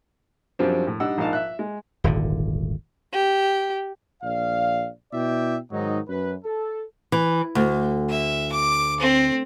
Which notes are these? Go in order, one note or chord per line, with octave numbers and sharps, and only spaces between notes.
F#2 F3 G3 C4 D4
A2
G3 D4 D#4 F#5 E6
A#1 G#2 D#5 F5 A5
E5 F#6
G#3
D#1 G#1 D3
G4
A#1 D5 F5
B2 E4 D5 E5 G5
G#2 D#3 F#3 D#4 D#5
F#2 B4
A4
E3
D2
E5
D6
C4